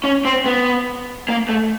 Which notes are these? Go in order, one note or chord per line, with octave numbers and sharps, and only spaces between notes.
C#4
C4
B3
A#3
A3